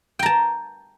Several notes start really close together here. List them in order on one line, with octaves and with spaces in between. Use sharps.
G5 A#5 A5